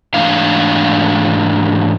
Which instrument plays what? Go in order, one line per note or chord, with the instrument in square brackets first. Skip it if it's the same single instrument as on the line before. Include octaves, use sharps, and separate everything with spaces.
[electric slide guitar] G#2 E3 A3 D4 F5